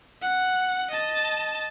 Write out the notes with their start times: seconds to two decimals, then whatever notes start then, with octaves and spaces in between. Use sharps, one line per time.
0.22 F#5
0.91 D#5 A5